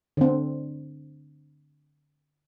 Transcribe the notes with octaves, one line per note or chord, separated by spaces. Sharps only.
D3 C4